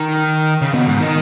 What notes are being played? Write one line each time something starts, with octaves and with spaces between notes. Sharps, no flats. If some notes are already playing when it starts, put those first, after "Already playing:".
Already playing: D#3
C#3
B2
G#2
D#3